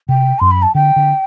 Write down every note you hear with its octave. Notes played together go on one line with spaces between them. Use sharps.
C3 G5
F#2 C6
B5
A5
D3 G5
D3